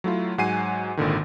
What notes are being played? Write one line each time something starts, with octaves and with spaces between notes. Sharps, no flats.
F#3 A3 E4 F4
G#2 F#3 F#5 G#5 C7 D#7
G#1 A#2 D3 D#3